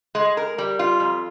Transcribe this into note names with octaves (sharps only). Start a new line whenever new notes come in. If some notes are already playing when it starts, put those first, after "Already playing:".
G#3
A#4
G3
F4
F2